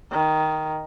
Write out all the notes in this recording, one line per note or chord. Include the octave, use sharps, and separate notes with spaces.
D#3